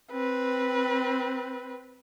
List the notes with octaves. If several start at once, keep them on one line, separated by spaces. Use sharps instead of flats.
C4 B4